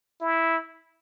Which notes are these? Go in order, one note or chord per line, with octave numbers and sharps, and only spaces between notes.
E4